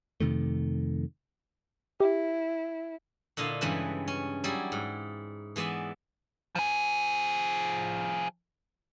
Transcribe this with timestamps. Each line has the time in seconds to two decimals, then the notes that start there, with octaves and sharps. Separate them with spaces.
0.20 F2 C3 D#3 A3
2.00 E4 G4
3.37 A#2 D3 E4 D#5 F5
3.61 G2 C#3 E3 G#3 B4
4.08 C#4
4.44 F#3 G3 E4 G#4 D5
4.72 G#2
5.56 E3 G#3 B3 D5 E5
6.55 F3 G#4